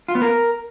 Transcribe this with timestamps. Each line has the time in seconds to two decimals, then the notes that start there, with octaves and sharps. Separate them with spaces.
0.08 F4
0.15 B3
0.22 A#4